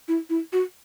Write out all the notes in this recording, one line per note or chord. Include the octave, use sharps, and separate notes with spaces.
E4
E4
F#4